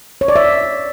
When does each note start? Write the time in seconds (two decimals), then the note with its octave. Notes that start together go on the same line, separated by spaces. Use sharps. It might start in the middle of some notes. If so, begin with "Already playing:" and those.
0.21 C#5
0.28 D5
0.36 E5